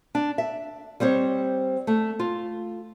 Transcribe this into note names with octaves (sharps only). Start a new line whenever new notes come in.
D4
E5
G3 C4 C5 C#5
A3
F4